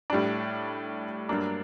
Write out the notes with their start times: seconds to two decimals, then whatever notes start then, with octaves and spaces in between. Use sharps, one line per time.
0.10 A2 G3 D4
1.29 G2 F#3 A#3 D4